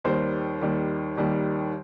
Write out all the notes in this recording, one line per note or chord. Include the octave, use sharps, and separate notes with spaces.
D#2 D#3 G3 C5
D#2 D#3 G3
D#2 D#3 G3